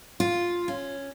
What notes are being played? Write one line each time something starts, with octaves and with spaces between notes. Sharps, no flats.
F4
C#4